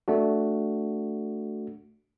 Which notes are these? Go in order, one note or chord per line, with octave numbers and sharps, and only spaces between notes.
A3 D4 F#4